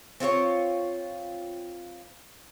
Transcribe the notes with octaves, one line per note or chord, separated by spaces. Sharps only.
C4 F4 G#4 C#5